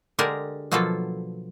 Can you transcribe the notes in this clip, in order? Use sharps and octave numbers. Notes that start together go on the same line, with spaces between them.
D3 G#3 D4 G4 G#4 A#4
B2 F3 F#3 A#3 F4 A4